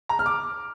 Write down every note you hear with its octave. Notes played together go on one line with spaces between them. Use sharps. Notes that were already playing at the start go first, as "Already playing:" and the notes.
A#5
F6
D6